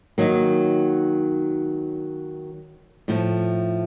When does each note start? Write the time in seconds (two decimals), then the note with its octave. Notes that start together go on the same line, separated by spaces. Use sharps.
0.18 D#3 F#3 A#3
3.08 A2 F3 A3